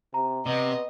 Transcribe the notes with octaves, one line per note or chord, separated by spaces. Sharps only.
C3 A#5
C3 B3 D#5